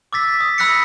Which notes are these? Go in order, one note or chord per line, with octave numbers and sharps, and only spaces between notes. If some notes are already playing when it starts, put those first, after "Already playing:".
D6 E6 A6 B6
D#6
B5 E6 F#6 A#6 B6 C#7